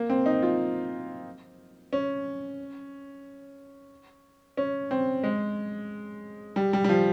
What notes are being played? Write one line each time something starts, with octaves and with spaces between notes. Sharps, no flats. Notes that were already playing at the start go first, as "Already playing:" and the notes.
Already playing: A#3
C4
D#4
F4
C#4
C#4
C4
G#3
G3
G3
G3
F3